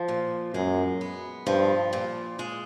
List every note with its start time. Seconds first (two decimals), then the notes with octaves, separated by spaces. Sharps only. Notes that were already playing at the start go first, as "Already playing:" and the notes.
Already playing: F3
0.08 A#2
0.54 F#2 G#3
1.01 B3
1.47 G2 F3
1.93 A#2
2.39 G#3